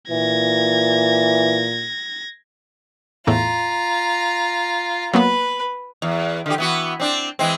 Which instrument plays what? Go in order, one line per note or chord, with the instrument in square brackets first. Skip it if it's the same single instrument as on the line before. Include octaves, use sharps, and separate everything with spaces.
[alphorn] A#2 [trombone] E3 [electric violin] G#6 A#6
[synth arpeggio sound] E2 A2 A3 [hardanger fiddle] F4 A#5
[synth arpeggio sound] F#3 A#3 B3 [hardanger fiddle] B4
[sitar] E2
D3 E3 G4
E3 B3 F#4
C4 D4
E3 G#3 C4